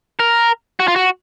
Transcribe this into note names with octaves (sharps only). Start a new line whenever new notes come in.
A#4
F#4
F4
F#4